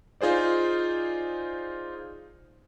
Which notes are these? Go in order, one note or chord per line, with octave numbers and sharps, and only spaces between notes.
D#4 F4 G#4 C5 D5